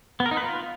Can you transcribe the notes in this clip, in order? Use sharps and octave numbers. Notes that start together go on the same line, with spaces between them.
B3
A#4
D#4
B4
F4